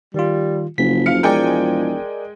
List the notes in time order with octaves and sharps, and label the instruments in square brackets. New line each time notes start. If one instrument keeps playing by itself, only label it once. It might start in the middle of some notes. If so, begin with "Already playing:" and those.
[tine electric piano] D#3 F4 [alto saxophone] G3
[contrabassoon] F#1 [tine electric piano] C#3 B6 [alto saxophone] F3
[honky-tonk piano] F5 C#7
[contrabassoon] E1 [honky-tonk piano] G#3 G5 G#5 [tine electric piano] A#4 D5